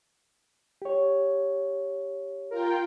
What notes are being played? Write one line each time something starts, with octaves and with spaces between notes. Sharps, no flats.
G4 C#5
F4 A#4 G5